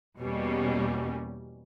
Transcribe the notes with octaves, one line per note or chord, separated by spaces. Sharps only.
E2 B2 G3 A#3 C#4